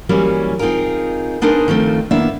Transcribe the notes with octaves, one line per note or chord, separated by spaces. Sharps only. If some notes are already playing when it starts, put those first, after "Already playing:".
E3 F#3 G3 A#3 C#4
C4 D#4 F4 G#4 A#4
B3 D4 D#4 G#4 A#4 C5
D#3 F3 A3 C4
D#3 A#3 B3 D4 E4 E5